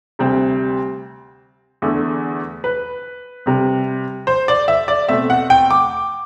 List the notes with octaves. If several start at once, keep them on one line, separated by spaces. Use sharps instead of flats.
D2 C3 G3 C4
E2 D3 A3
B4
C3 G3 C4
C5
D5
E5
D5
B2 A3 C4 E5
F#5
G5
D6